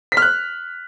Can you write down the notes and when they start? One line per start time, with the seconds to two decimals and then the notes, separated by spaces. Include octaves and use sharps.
0.12 B6
0.17 F6
0.22 F#6